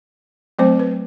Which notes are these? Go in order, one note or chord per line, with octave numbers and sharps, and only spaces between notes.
F#3 A3 C4 C5
B4